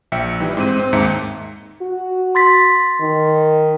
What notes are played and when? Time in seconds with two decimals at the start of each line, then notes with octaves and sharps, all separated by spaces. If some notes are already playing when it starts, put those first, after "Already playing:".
0.12 A#1 E5 G5 C#7
0.40 E3 G3 D#4
0.57 G#2 C4 D#7
0.80 C4
0.93 D#2 G#2 D#4 E5 A#5 C#7
1.82 F#4
2.35 C6 A6 B6
3.01 D#3